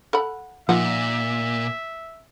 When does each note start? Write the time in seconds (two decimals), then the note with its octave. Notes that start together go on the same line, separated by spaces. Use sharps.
0.13 A4 F#5 B5
0.69 A#2 D#3 F3 E5 F#5